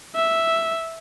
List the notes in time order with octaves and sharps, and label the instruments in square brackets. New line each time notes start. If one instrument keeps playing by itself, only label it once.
[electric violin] E5